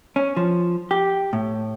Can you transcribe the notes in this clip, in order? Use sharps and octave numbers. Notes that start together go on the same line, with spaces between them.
C#4
F3
G4
A2